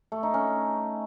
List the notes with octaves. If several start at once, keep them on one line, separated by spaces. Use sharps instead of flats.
A3
D#4
C#4